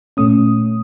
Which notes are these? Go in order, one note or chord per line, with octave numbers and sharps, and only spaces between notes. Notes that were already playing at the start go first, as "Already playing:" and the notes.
A#2 A3 C#4 D#6